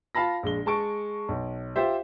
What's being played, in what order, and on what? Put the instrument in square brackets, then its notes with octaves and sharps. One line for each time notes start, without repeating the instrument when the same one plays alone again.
[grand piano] F4 F5 A5 B5 A#6
A#1 G#3 G7
G#3 A5 C#6 D7
B1
F4 G4 C5 E5